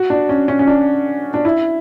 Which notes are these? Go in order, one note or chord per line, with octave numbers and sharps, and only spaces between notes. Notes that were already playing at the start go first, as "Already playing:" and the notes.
Already playing: F#4
D4
C#4
C#4
C#4
D4
D4
E4